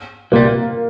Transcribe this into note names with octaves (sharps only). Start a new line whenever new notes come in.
C2 A#2 G3 A#3